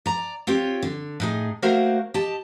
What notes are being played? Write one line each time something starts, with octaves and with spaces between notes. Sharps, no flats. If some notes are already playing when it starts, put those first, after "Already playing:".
D5 A#5
C4 F4 G4 C#5
D3
A2 D#4 G#4
A3 A#3 F#4 A#4 C5 F5
G4 D#5 A5